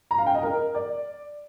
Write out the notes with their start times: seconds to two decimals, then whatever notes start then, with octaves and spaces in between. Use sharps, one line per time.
0.11 A#5
0.18 F5
0.26 G5
0.35 D#5
0.43 A#4
0.75 D5